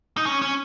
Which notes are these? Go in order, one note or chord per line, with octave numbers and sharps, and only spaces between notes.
D#4
C#4
C#4